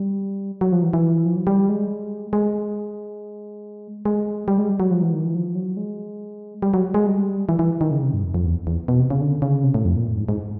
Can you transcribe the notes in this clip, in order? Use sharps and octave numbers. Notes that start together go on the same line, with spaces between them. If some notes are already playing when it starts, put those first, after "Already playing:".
Already playing: G3
F#3
F3
E3
E3
F3
F#3
G3
G#3
G#3
G#3
G3
G#3
G3
F#3
F3
E3
D#3
E3
F3
F#3
G#3
G3
F#3
G#3
G3
E3
E3
D#3
C#3
C3
G2
F2
F2
E2
E2
B2
C3
C#3
D3
C#3
C3
A2
F2
A#2
A2
G#2
G#2